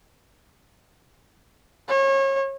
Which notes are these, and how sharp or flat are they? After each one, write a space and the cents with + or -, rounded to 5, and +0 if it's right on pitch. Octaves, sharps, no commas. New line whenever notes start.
C#5 -35